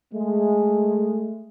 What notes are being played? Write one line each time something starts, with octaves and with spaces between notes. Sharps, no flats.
G#3 A3